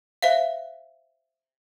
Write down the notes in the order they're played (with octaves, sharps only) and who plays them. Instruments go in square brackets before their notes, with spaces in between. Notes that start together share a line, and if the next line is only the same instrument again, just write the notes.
[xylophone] C5 E5 F5